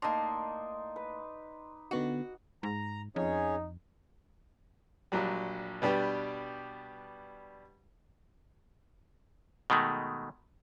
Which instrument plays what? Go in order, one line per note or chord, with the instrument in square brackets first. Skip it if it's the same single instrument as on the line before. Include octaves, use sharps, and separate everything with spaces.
[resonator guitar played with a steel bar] A2 A#3 [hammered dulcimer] D#4 D5 [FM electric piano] C6
[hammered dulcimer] B4
[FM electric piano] D3 B3 D#4 [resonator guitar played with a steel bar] F#4
[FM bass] G#2 [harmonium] A#5
[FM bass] F2 [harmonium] C#4 G#4 C#5 [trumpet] D#4
[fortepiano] A#1 A#2 F#3 G3
B2 G3 D4 G4 B4
[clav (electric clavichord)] B2 D#3 G#3 A3